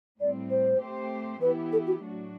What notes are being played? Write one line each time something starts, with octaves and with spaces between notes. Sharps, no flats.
A2 G3 C4 D5
C5
A3 C4 G4 C5
E3 B3 E4 G4 B4
A4
F#4
A2 F#3 A3 D4 F#4